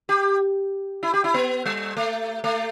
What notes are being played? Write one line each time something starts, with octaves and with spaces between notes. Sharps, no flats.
G4
E4
G4
E4
B3
G3
A3
A3